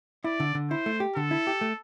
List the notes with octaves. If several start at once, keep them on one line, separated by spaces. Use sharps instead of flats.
E4 D5
D3
D3
E4 C5
A3
G4
D3 A4
E4
G4
A3